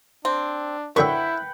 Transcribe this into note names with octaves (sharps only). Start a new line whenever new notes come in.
C4 D4
F#2 D3 E4 B4 E5 F#5 G5 C#6